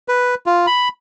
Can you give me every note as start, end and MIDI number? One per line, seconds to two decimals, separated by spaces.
0.08 0.35 71
0.46 0.66 65
0.67 0.88 83